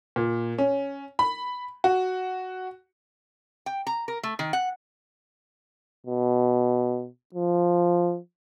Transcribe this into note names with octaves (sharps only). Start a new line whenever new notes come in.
A#2
C#4
B5
F#4
G5
A#5
A#4
A3
D#3
F#5
B2
F3